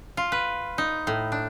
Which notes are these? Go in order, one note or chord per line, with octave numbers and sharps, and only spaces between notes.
F4
B4
D#4
A2
D4